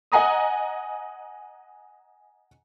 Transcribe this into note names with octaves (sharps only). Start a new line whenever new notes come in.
D#5 F#5 G#5 A#5 D#6